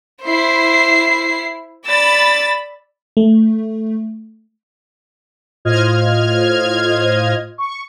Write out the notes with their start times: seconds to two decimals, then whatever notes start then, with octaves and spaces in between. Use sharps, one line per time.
0.24 E4 C5 C7
1.87 D5 B5 E6 A6
3.17 A3
5.65 A2 F4 C5 D#5 F6 G#6
7.58 C#6